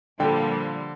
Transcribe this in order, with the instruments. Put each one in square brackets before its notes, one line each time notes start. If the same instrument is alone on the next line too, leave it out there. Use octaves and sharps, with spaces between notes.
[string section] A#2 F3 G3 [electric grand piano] D3 [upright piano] A4 G5